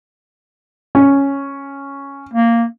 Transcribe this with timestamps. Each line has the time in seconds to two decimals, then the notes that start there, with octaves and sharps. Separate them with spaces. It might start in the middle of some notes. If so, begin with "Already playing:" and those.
0.95 C#4
2.34 A#3